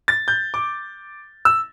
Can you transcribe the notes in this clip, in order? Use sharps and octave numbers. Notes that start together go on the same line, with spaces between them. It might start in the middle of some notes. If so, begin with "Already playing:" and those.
A6
G6
D6
E6